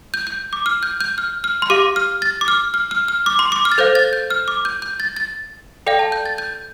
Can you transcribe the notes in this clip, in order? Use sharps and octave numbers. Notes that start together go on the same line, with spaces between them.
G6
G6
D6
F6
G6
G6
F6
F6
C6
G4 F5 D6
F6
A6
D6
F6
F6
F6
F6
D6
C6
D6
F6
A6
A4 C5 F5 G6
A6
G6
F6
D6
G6
G6
A6
A6
A4 D5 F5 G5
A5
G6
A6
G6